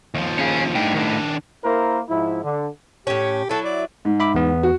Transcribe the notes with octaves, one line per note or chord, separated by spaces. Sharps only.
D#2 F3
C#4 G#4
A2 D4 D#4 G5
D#3 D4
A#3 E4 A#4 C5
G#2 F3 E4
D3
A2 C#4 G4
F#3 E4 A4
D5
G#2
E5 B5 D6
E2 B3
F#4